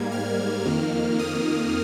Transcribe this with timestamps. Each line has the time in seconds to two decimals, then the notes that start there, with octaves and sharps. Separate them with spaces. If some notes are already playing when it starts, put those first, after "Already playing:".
Already playing: G#2 G3 A#3 G#6
0.12 F6
0.65 F2 D#3 A#3
1.19 D#6